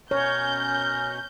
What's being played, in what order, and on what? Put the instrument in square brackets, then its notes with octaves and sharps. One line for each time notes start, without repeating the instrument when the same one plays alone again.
[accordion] B2 C#4 [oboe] A#4 [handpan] C#5 [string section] G6